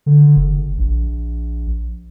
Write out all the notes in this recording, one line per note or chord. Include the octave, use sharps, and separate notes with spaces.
D3
F#1
A#1